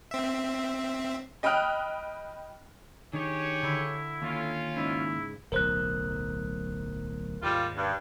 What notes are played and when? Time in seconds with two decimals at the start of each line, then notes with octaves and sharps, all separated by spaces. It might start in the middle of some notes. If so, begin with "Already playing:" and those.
0.11 C4 E5
1.43 D#5 G5 B5 D#6 F6 F#6
3.13 D#3 D4 D#4 G4 G#4 C#5
3.63 D3 E4
4.22 D#2 C#4 F4
4.76 G#2 C#3 E4
5.52 D1 B1 A#4 C5 F#6
7.42 D#2 G#2 G3 F4
7.77 G2